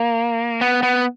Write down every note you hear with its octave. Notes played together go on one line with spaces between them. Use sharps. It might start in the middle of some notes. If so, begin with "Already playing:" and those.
Already playing: A#3
B3
B3